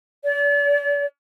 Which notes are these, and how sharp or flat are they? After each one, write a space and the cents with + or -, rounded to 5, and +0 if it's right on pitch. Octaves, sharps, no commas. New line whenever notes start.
D5 -40